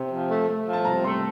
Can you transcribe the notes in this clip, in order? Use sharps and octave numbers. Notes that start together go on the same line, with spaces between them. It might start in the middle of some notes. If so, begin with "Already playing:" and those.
Already playing: C3
F3
A3
A3
F3
A5
C3 A#5
A3 C6